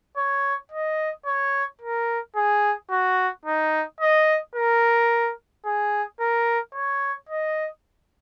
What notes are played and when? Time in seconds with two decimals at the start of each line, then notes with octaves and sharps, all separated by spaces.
0.17 C#5
0.72 D#5
1.26 C#5
1.81 A#4
2.36 G#4
2.91 F#4
3.45 D#4
4.01 D#5
4.55 A#4
5.66 G#4
6.20 A#4
6.75 C#5
7.29 D#5